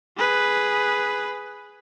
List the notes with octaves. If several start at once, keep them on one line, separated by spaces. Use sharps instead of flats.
G#4 B4